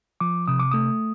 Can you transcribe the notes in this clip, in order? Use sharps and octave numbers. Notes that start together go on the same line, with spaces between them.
F3 D6
C3 D#6
D6
A3 D#6